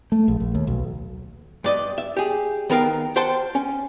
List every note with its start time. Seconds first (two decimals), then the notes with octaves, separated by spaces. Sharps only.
0.12 A3
0.28 A#1
0.40 A#1
0.55 D#2
0.67 B1
1.64 G2 D5 D#5
1.98 E5
2.17 G4 G#4
2.70 D#3 B3 A#4 F5 G5
3.16 C5 F#5 G5 A5 C6
3.55 C#4